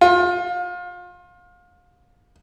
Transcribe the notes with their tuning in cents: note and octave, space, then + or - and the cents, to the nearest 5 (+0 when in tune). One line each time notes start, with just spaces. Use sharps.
F4 +30